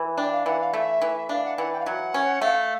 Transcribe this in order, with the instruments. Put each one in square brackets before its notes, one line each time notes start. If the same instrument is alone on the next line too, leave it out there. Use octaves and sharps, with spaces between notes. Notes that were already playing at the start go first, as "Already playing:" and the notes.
Already playing: [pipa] E3
[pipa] D4 [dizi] G5
[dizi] F5
[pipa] E3 [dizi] F#5
[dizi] F5
[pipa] A3 [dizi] E5
[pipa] E3
[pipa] D4 [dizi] F5
[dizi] F#5
[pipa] E3 [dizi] F#5
[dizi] G5
F5
[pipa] F#3 [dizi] F#5
[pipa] C#4
[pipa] A3 [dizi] F5